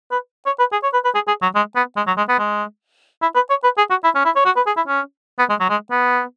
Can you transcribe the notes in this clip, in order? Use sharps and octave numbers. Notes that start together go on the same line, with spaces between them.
B4
C#5
B4
G#4
C#5
B4
B4
G#4
G#4
F#3
G#3
B3
G#3
F#3
G#3
B3
G#3
E4
B4
C#5
B4
G#4
F#4
E4
C#4
E4
C#5
F#4
B4
G#4
E4
C#4
B3
G#3
F#3
G#3
B3